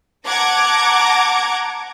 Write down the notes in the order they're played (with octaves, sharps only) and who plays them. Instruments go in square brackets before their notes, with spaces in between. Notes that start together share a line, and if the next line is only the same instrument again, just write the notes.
[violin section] F#5 A5 A#5 D6 G#6